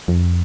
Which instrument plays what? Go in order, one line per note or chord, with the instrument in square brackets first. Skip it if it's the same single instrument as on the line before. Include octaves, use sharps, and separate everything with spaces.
[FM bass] F2